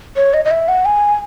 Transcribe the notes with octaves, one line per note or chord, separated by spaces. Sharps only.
C#5
D#5
D#5
E5
F#5
G#5